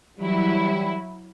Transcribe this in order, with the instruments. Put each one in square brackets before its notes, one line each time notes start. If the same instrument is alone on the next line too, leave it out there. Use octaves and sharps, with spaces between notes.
[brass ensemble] E3 G3 [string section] F#3 E4